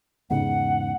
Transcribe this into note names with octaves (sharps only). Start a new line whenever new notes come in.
E2 G#2 C#3 F#5